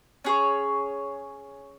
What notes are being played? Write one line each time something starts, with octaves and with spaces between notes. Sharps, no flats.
C#4 G#4 C#5